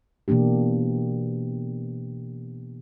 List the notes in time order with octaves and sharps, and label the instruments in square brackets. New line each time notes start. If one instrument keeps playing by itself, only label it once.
[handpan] B2 E3 A#3 D4 G4